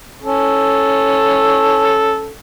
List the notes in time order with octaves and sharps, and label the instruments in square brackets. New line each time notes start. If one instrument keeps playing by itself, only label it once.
[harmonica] C#4 A4